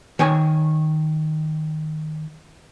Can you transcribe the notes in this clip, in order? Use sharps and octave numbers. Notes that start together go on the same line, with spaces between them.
D#3 C#5 G#5